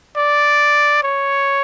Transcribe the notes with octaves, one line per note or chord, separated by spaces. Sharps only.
D5
C#5